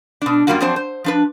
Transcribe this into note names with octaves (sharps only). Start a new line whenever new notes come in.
B2 D4
F#2 A#2 G3 A#3 F4 F#4
F3 F#3 C4 D4 C5
C5
F3 D4 B4